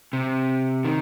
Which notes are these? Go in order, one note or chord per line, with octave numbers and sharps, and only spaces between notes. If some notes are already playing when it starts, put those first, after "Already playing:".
C3
D#3